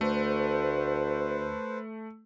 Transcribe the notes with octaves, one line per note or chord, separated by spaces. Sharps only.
D2 A3 B4 C5